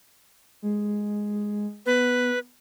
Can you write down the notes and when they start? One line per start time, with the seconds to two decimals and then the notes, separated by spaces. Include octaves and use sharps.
0.62 G#3
1.86 B3 B4